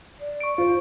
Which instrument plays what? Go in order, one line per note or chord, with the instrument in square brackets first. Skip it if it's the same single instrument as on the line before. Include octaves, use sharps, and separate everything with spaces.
[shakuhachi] D5
[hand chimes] C#6 D7
[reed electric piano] F4 [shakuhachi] C5